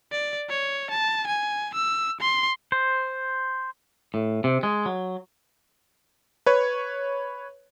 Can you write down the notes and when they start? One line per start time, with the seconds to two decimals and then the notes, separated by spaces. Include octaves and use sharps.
0.12 D5
0.50 C#5
0.91 A5
1.27 G#5
1.75 E6
2.21 C6
2.72 C5
4.14 A2
4.44 C3
4.63 G#3
4.86 F#3
6.46 B4 C#5